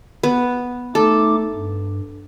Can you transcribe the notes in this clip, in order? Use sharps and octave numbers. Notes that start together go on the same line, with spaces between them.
B3
A3 D#4 A4 D6
G2